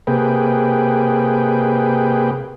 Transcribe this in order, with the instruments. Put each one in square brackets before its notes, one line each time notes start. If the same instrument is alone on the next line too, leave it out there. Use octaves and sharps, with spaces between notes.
[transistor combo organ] C3 A#3 G#4 B4 G5